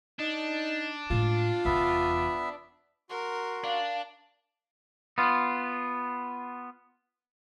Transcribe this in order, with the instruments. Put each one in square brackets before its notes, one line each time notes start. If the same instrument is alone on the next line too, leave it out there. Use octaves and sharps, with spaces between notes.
[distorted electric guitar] D4 [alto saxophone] D#4
[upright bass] A2 G#3 [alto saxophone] F4
[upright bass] F1 E2 [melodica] B3 E5
[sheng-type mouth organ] F#4 C6 [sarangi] A#4
[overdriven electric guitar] D4 [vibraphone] F5
[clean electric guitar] B3 F4